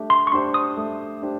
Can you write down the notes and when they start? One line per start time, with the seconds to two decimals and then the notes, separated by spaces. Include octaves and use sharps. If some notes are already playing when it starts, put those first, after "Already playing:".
Already playing: A3 D4 G4
0.10 C6
0.27 C#6
0.32 D4 G4 C5 C6
0.54 D#6
0.77 A3
1.22 D4 G4 C5